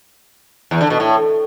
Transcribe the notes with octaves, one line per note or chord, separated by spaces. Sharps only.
E2
D3
B2
A2